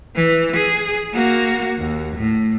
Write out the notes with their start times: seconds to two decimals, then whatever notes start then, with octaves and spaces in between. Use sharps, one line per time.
0.15 E3
0.56 G#4
1.13 A#3 F#4
1.78 D#2
2.16 A2